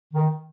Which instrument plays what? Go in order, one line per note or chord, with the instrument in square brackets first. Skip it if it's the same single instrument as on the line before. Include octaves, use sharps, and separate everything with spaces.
[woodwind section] D#3